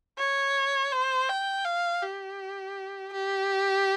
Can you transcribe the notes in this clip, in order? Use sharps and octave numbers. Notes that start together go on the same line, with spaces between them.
C#5
C5
G5
F5
G4
G4